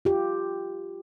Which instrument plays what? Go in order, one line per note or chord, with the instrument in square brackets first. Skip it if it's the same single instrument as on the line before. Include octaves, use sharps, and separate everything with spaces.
[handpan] F4 G4